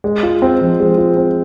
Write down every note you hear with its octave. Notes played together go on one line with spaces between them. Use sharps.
G#3
F4
C4
F3
G#3
F4
C4